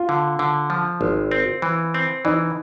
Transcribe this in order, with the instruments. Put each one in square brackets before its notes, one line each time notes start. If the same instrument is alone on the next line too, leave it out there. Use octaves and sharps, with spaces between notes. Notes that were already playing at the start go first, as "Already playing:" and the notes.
Already playing: [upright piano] F4
[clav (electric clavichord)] D3
D3
F3
G#1
C4
E3
C4
[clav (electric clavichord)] E3 [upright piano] D#4